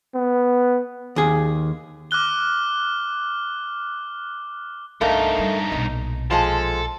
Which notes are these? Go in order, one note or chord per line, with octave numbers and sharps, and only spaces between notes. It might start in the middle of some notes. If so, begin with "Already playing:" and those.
B3
D#2 G#4
D6 F6 F#6 G7
C2 G2 A3 A#3 D#4
G3
B1 A#2 D#5
F3 G#3 A4 A5